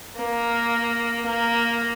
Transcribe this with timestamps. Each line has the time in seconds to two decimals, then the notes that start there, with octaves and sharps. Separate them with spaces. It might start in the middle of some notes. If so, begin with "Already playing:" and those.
0.16 A#3
1.26 A#3